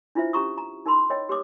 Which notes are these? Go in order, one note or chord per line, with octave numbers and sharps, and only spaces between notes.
D4 E4 F4 B4 C5 E5
C#4 G4 A#5 C#6 D#6
A#5
D#4 A#4 A5 B5 C6
A#4 C#5 D#5 G5
G4 B4 C#5 D6 D#6